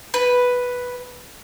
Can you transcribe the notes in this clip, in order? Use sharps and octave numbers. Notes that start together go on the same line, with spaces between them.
B4